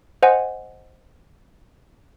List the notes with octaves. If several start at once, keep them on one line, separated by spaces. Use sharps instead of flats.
C5 D#5 F#5 G#5